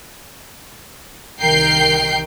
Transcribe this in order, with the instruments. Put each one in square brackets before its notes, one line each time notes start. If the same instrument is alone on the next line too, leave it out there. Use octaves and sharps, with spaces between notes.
[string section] C2 D#3 A#4 G5 G6 C7